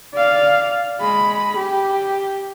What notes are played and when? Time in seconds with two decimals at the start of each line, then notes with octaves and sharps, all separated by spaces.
0.14 D5 F5
1.00 G#3 B5
1.56 G4